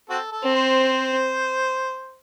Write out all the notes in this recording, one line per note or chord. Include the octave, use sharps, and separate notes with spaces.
C4 F#4 A4
A4
C4
C5